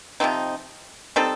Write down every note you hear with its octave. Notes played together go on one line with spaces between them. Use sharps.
C3 F3 C4 D#4
G3 C4 D#4 A4